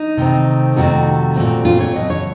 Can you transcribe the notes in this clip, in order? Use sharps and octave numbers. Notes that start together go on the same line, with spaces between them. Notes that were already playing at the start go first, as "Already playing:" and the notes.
Already playing: D#4
C3 D#3 A3 C4
F2 C3 D#3 A3 F#4
A#2 A3 C4
F4
C#5
C#3 F#3 A3 D#5
C#5